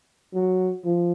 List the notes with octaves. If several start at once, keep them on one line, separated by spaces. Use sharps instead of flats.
F#3
F3